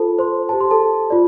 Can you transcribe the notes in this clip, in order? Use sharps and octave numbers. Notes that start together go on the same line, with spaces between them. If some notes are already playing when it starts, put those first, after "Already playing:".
Already playing: F4 A4 C5 A5
C5 C6
G4 C5 A5
C6
A4 A5
F4 D5